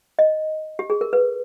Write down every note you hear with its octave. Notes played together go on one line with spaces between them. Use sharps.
D#5
G4
G#4
A#4
B4